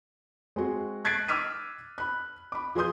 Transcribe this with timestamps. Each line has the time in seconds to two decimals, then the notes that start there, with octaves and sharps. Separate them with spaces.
0.56 G#3 C4 F#4 G#4
1.05 F#6 G#6 A6 B6 C7 D7
1.28 D6 E6 F6 B6 D#7
1.98 B5 F#6
2.52 B5 D6
2.75 F3 G#4 B4 C6 D#6 G6